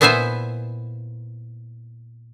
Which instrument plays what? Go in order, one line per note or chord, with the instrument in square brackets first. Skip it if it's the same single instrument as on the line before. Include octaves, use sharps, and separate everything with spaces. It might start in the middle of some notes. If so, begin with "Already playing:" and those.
[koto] A#2 B3 E4 C5 E5 G#5